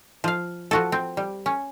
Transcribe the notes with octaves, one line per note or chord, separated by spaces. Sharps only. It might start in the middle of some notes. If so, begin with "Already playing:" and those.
F3 F5
F3 F#4 A4
C4
G3
C#4